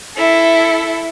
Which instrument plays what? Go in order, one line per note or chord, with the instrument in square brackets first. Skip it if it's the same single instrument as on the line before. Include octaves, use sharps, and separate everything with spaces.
[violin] E4 A4